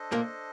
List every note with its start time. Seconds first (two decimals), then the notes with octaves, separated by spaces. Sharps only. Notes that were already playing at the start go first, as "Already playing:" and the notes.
Already playing: D4 A4 C5 D#5
0.12 A#2 A#3